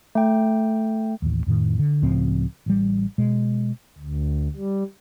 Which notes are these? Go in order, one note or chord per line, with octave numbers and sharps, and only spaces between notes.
A3 G5
A1 D#2
F2 A2 D#3
D3
C#2 A2 F3 C4
A1 G3
B2 G#3
D2
G3